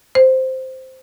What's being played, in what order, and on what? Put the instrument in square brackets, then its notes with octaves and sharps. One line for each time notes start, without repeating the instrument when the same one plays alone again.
[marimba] C5